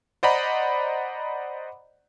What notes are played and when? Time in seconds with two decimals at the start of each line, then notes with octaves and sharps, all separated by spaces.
0.23 C5 D5 D#5 F#5 A#5 B5